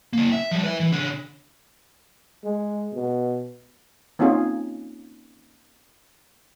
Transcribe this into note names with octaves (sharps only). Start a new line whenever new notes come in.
C#3 A#3
E5
F3 G3
B4 E5
E3
C#3 D4
G#3
B2
A#3 C4 C#4 D#4 F4 G#4